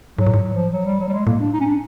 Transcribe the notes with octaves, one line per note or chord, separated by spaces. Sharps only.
G#2 F#3
A2
G#2 F#3
F3
F#3
G3
F#3
G3
G#3
A2 A#3
D4
D#4
C#4
D4